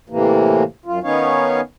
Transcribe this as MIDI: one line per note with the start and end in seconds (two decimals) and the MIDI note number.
0.10 0.63 45
0.10 0.63 48
0.10 0.63 52
0.10 0.63 58
0.86 0.99 42
0.86 0.99 65
1.03 1.61 51
1.03 1.61 59
1.03 1.61 61
1.03 1.61 63
1.03 1.61 73
1.03 1.61 77